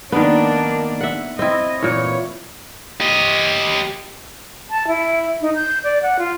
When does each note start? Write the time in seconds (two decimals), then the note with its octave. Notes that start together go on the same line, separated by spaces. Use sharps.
0.12 D#3 A#3 B3 D4
1.01 E5 F#5
1.39 C4 E4 D#5
1.83 A#2 E3 C#5
3.01 G4 D#5
4.70 A5
4.87 E4
5.42 D#4
5.55 G6
5.84 D5
6.02 F#5
6.19 F4